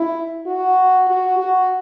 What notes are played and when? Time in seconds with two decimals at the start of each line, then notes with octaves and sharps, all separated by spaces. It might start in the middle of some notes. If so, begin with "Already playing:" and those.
Already playing: E4
0.46 F#4
1.08 F#4
1.38 F#4